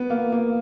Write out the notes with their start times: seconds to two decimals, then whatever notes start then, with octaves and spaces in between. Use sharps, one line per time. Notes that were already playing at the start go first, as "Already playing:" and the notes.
Already playing: B3
0.10 A#3
0.32 A#3